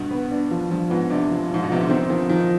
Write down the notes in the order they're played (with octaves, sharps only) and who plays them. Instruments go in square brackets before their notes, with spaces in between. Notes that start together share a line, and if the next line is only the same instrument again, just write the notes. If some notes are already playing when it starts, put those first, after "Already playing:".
Already playing: [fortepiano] G2 B2
[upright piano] B3
D4
F3
[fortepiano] G2 [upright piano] F3
[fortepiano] G#2 [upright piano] B3
[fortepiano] C3 [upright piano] D4
[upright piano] F3
[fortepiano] G#2 [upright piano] F3
[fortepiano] B2
[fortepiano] C3 [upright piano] B3
[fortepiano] D3
[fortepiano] D#3 [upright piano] C4
[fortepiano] D#3 [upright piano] F3
[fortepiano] D#3 [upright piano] F3